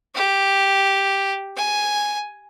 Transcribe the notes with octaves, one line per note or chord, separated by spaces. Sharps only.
G4
G#5